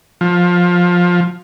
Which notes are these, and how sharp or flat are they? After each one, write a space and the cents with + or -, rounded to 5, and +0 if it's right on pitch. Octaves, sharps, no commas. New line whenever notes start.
F3 +20